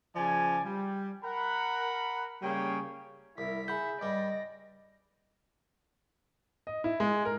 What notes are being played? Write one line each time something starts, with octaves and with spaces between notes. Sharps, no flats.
C#3 F3 D5 G#5
G3
A#4 F#5 B5
C#3 G3 A#3 G#4 C#5 G5
C2 E4 A#4 B6
G#4 E5 F#5 B5 G6
G2 G3 D5 D#5 A#6
D#5
E4
G#3
A#4